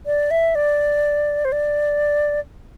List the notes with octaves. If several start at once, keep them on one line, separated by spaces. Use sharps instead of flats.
D5
E5
D5
C5
D5